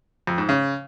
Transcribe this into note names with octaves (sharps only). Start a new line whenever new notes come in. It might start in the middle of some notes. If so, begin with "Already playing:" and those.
F2
G#2
C#3